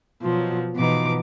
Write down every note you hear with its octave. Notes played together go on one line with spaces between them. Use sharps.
B2 F3 F#3
B2 E3 F3 D#4 D6